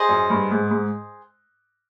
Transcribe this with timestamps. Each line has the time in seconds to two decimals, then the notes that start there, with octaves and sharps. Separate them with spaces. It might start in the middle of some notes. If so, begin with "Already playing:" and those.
Already playing: G#4 C5 D#5
0.09 F#2
0.30 G2
0.51 G#2
0.71 G#2